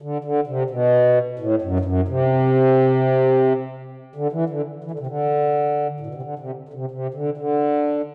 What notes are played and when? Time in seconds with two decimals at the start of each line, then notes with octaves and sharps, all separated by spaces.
0.02 D3
0.24 D3
0.47 C3
0.70 B2
1.39 A2
1.62 F#2
1.80 G2
1.85 F#2
2.08 C3
4.16 D3
4.32 E3
4.50 D3
4.84 E3
4.91 D3
4.99 C3
5.07 D3
6.00 A2
6.07 B2
6.14 C3
6.22 D3
6.39 C3
6.69 D3
6.74 C3
6.91 C3
7.14 D3
7.37 D3